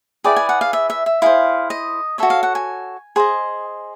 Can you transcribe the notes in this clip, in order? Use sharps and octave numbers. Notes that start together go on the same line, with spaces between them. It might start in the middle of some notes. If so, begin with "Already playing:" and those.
E4 G#4 B4 D5 G5
G#5
F#5
F5
E5
E5
E5
E4 G#4 C5 F5
D#5
F#4 A4 C#5 E5
F5
F#5
G#5
G#4 C5 D#5